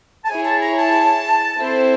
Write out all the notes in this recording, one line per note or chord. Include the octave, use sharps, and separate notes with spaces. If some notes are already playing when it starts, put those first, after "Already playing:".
A5
E4 G#4 C#5 G#5
A5
A#5
A5
C4 E4 A4 C5